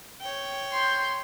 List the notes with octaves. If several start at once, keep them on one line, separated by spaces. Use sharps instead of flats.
C#5 G5
C6 G6